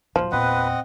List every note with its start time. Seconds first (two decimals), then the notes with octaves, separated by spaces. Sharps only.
0.16 D#1 F3 F#3
0.32 E2 A#2 C4 B4 D#5 F#5